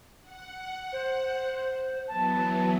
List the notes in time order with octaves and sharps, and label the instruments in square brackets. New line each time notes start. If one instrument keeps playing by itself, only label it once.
[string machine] F#5
[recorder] C5
[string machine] E3 F#3 B3 [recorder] A5